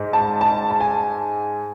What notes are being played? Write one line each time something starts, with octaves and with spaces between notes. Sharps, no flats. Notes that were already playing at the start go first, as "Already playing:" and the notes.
Already playing: G#2 G#3
A5
A5
A5
G#5